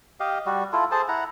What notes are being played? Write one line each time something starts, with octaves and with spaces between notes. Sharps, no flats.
G4 D#5 F5
G3 F#4
E4 F4 A4
G#4 A4 C5 A5
E4 F#5 A#5